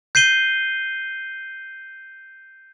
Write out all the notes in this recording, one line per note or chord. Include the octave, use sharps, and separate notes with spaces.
G6 C7 D#7 G7